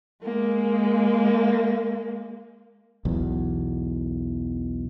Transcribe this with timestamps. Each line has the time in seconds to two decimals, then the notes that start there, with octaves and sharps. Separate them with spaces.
0.23 G#3 A#3
3.05 B1 E2